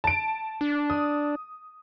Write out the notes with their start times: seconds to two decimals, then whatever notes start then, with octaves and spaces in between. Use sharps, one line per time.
0.04 A5 D7
0.61 D4
0.90 D#6